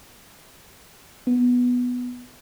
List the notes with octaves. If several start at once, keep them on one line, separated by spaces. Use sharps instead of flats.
B3